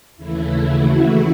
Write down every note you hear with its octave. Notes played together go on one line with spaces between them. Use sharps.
D#2 C#3 E3 A3 E4
F#4